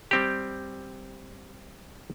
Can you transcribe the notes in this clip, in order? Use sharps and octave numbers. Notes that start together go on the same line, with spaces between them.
G3 C4 G4